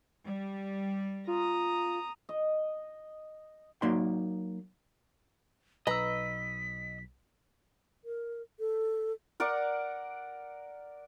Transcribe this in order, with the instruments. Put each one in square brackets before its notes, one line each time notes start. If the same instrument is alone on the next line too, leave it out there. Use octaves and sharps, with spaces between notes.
[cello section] G3
[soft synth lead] F4 [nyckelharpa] A#5 D#6
[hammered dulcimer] D#5
[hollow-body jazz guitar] F#3 A#3 D#4 D5 C6
[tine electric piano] B1 [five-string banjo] B4 A#5 [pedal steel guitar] D#5 E6 [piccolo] B6
[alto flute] A#4
A4
[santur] A#4 D5 F#5 A#5